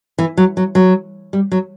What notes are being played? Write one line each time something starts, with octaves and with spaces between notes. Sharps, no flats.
E3
F#3
F#3
F#3
G3
F#3